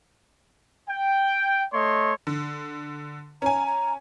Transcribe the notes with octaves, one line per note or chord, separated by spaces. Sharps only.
G5
A3 C#5 D#5 C6
D3
C#4 G#5 A#5
A#5